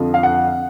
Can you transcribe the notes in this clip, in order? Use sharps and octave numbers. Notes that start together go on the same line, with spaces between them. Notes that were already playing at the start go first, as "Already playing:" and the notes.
Already playing: F2 D3 F3
F5
F#5